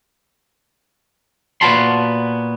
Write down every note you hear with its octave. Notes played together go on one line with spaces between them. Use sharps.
A#2 B3 F#4 A5 B5 C6